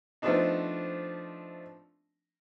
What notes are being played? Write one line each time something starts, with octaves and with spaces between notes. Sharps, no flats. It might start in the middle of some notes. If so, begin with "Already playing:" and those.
F3 A3 B3 C4 D4 D#4